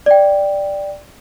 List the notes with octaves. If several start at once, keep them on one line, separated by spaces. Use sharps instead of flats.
D5 G5